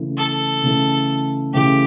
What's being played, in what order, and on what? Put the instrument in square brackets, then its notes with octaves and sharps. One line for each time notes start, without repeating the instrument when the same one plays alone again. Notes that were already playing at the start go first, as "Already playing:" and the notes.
Already playing: [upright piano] C#3 E3 A3
[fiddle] A4
[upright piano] C#3 E3 A3
[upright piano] C#3 E3 A3 [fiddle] G4